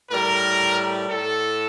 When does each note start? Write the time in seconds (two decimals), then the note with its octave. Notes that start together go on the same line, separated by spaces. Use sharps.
0.09 A2 G3 A#4
1.08 A2 A4